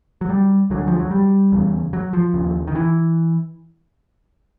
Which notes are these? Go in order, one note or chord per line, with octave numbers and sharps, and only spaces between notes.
F#3
G3
D2 D3 F#3
F3
F#3
G3
E2 C#3
F#3
F3
D#2 C#3
D#3
E3